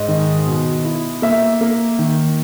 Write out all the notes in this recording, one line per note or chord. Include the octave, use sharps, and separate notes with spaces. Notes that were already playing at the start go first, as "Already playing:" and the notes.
Already playing: G#2 D#5
D#3
B2
E4
A#3 E5
A#3
D#3